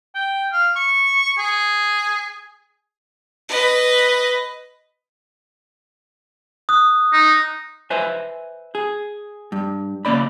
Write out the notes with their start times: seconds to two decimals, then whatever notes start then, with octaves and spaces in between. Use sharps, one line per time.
0.15 G5
0.52 F5
0.76 C#6
1.39 G#4
3.49 B4 D#5
6.69 D#6 F#6
7.13 D#4
7.90 B4 C5 E5 G#5
8.75 G#4
9.52 G2
10.05 C#3 A#3 C#4 D5 B5